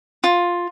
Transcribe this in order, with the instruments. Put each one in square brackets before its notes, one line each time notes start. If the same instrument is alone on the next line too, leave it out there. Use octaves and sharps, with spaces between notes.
[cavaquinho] F4